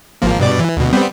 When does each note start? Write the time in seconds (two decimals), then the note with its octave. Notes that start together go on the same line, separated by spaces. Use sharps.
0.22 G#1 F3 A#3
0.40 G2 B2 D5
0.60 E3
0.77 D2 B2
0.93 G3 B3 C4